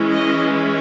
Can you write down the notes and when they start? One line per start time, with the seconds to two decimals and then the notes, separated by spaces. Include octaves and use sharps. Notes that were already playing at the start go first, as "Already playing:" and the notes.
Already playing: E3 G#3 C#4 E4
0.13 D#5